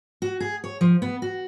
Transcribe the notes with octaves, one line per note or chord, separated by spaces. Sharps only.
F#4
G#4
C#5
F3
B3
F#4